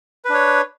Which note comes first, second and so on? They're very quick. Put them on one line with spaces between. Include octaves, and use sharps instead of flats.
B4 D4 C#5